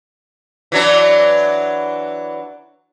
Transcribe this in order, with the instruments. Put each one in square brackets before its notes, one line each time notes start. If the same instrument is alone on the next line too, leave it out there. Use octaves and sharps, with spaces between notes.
[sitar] E3 F#3 D4